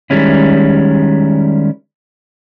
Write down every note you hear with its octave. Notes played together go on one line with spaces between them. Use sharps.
D#3 G3 G#3 C#4 E4